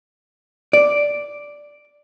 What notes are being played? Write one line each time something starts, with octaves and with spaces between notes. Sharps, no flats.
D5